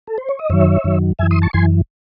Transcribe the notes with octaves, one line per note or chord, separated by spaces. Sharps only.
A4
C5
C#5
D#5
F#2 D#3 F#3 C#5 E5
F#2 D#3 F#3
F#2 E3 E5 G#5
C6 D#6
A5 C#6
F#2 E3 G#5 C6